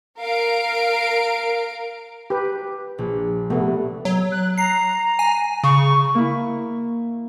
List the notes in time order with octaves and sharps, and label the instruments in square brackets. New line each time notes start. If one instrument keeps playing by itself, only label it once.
[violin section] A#4 F5 D7
[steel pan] G4 B4
[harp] A#1
[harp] C2 [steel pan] A3 B3
[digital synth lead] F#3
[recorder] F#6
[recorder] A#5 [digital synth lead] C7
[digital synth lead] G#5
[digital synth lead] C#3 [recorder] C#6
[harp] A#3 E4